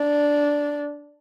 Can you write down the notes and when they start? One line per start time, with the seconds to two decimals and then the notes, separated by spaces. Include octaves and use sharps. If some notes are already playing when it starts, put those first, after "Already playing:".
Already playing: D4